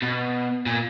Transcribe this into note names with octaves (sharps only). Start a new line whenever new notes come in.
B2
A#2